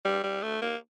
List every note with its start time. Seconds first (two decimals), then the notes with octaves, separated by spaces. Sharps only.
0.05 G3
0.24 G3
0.43 A3
0.62 A#3